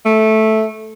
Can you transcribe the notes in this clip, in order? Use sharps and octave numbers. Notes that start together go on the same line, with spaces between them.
A3